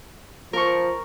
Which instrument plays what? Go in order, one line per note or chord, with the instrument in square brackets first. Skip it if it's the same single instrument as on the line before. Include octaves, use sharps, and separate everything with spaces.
[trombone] F3 [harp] A#4 C#6